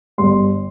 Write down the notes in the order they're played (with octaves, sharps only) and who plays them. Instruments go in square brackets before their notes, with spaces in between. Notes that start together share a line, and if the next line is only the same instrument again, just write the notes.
[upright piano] G1 G2 G3 C6